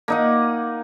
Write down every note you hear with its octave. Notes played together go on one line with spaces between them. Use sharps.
A#3 D#4 F#5